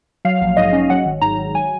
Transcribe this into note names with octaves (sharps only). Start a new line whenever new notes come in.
F#3 F5
A#1
G#2 D#5
C#4
F#3 F#5
G#1
G#2 A#5
G#1
F#3 G#5